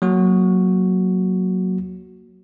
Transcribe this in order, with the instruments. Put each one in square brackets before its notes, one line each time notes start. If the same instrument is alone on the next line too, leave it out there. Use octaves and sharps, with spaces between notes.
[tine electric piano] F#3 A#3 F#4